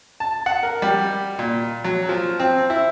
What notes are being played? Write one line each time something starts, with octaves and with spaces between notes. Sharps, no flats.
A5
F#5
A#4
G3
A#2
F#3
F3
C4
E4